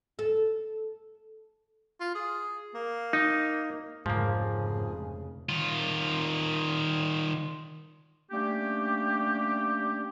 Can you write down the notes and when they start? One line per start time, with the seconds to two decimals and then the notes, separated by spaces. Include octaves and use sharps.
0.19 A4
2.00 F4
2.15 G#4
2.75 A#3
3.13 D#4
4.06 F1 F2 G#2 C#3 F3 A#3 G#4
5.49 D#3 F4
8.31 G3 A3 A#3 C#4 D4 G4